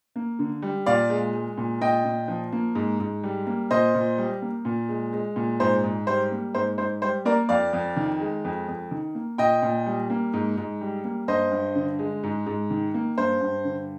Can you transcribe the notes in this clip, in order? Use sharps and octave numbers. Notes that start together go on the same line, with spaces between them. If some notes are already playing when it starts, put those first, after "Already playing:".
A#3
D3
G3
A#2 D5 F5
G#3
G#3
A#2
A#2 D#5 G5
A#2
F3
A#3
G#2
G#2
G3
A#3
A#2 C5 D#5
A#2
G3
A#3
A#2
G#3
G#3
A#2
G#2 C5
G#2
G3 C5
A#3
G#2 C5
G#2 C5
G3 C5
A#3 A#4 D5
F2 D5 F5
F2
D#3
G#3
F2
F2
D#3
A#3
A#2 D#5 G5
A#2
G3
A#3
G#2
G#2
G3
A#3
G2 C5 D#5
G2
D3
G#3
G#2
G#2
D#3
A#3
G2 C5
G2
D3